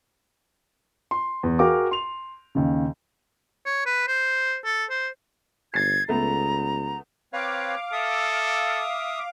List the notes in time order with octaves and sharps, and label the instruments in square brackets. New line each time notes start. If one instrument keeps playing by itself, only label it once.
[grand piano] C6
E2
F#4 G#4 A#4 F5 G5 D6
C6 F7
D#2 C#3
[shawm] C#5
B4
C5
A4
C5
[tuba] G1 [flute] G#6 [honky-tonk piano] A6 C7
[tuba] C#2 [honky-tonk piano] A3 B3 [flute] A#5
[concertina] C4 B4 C#5 [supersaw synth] F5 D6
[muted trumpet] A4 [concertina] E5 D#6